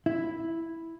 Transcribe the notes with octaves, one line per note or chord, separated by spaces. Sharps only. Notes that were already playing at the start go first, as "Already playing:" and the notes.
E4